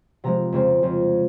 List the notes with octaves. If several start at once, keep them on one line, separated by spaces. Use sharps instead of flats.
C3 F3 G#3 A#5
F2 C#3 G#3 C4
F2 C#3 F3